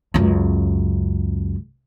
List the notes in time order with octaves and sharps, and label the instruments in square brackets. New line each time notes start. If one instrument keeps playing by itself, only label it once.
[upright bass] C#2 F#2